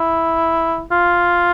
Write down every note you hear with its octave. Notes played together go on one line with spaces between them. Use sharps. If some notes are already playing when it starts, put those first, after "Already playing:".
Already playing: E4
F4